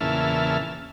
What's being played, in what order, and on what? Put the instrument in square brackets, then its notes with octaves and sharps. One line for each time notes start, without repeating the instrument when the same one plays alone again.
[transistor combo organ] E2 A#2 C#3 E5 A5 F6